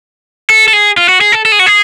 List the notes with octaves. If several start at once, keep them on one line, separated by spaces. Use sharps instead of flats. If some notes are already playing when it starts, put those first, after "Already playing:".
A4
A4
G#4
F4
F#4
G#4
A4
A4
G#4
F#4
G#4